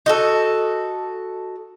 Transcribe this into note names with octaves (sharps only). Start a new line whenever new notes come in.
D#4 F#4 A4